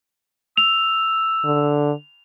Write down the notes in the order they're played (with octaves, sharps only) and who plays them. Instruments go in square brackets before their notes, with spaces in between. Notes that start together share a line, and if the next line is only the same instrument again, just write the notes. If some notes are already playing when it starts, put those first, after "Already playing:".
[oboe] E6 [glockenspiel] F7
[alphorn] D3